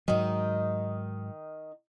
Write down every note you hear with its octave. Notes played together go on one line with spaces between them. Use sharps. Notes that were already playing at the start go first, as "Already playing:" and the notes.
G#2 D#3 F#3 D#4